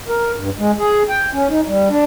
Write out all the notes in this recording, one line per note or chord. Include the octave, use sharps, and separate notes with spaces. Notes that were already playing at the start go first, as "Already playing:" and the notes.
A#4
G2
G#3
G#4
G5
C#4
D#4
G3
D4